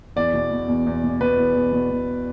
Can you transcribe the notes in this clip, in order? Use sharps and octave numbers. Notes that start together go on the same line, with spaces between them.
E2 D5
B2
B2
E2
E2
B2
B2 B4
E2
E2
B2
B2